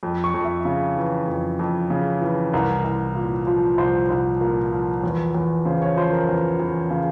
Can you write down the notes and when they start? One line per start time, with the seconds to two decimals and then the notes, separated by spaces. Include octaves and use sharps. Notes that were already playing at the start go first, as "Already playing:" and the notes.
0.03 F2
0.24 C#6
0.34 F2
0.44 E5
0.65 C#3
0.96 E3
1.28 F2
1.59 F2
1.90 C#3
2.22 E3
2.53 C2 A#4
2.84 C2
3.15 A#2
3.47 F3
3.78 C2 C5
4.09 C2 C5
4.41 A#2 A#4
4.72 F3
5.04 E2
5.35 E2
5.65 C#3 C5
5.82 C#5
5.97 F3 C5
6.12 A#4
6.29 E2
6.60 E2
6.90 C#3